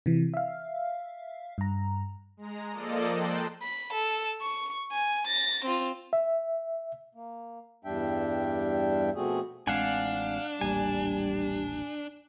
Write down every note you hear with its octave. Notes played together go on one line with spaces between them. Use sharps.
C3 E3
E5 F5
G2 A#5
G#3 A#5
F3 A#3 A4 D5 D#5
G5 A5 C6 F#6
B5
A4
C#6
G#5
A6 A#6
C4 F4
E5
A#3
E2 G2 G3 D4 E5 G5
B2 F3 A3 C4 F#4 G#4
A1 G#3 C4 D4 F5 F#5 G#5
D#1 A1 G3 A#3 G#5